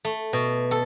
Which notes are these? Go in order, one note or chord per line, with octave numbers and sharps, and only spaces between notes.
A3
B2
A4